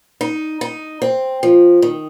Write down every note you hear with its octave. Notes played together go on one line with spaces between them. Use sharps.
D#4
D#4
C4
F3
D#3